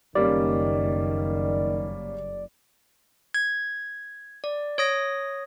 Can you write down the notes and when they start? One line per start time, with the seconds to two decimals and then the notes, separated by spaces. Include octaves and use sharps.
0.15 F#1 D#3 G3 A#3 C#4 D5
3.34 G#6
4.44 D5
4.78 C#5 D#6 A#6